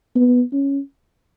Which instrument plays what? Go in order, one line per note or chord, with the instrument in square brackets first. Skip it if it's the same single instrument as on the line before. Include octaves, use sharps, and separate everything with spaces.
[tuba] B3
C#4